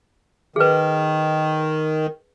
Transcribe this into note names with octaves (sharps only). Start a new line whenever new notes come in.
D#3 G#4 B4